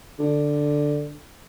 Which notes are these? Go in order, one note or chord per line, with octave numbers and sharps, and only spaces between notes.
D3